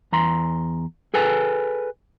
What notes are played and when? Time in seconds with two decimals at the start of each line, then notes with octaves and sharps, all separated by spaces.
0.12 E2 A#5 C6
1.14 G#4 A4 B4 G#5